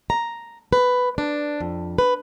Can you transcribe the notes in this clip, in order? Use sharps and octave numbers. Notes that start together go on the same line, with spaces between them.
A#5
B4
D4
F2
B4